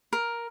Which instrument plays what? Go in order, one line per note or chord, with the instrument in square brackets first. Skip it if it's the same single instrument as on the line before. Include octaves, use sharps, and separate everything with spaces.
[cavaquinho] A#4